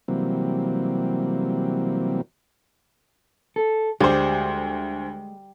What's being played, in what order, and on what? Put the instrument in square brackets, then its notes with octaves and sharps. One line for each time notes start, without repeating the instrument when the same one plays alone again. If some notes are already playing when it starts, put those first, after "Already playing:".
[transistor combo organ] C3 E3 F#3 G3 A#3 C4
[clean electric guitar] A4
[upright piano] D2 C5 [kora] G3 [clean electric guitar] G#3